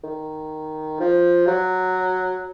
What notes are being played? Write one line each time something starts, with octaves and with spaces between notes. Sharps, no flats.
D#3
F3
F#3